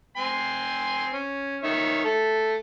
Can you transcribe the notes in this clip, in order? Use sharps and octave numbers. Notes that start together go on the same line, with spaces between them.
C4 G#5 C6
C#4
D#3 C#5 E5
A3 A4